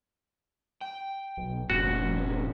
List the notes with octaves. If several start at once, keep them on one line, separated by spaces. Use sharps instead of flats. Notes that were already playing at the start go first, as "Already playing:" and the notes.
G5
B1
F1 G2 A#2 C#4 F#4